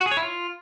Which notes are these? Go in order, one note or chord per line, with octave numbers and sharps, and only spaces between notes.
F#4
G#4
C#5
E4
F4